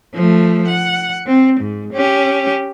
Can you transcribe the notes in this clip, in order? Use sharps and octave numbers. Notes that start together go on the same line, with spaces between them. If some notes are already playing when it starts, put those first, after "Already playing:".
F3 A3
F#5
C4
G#2
C#4 G4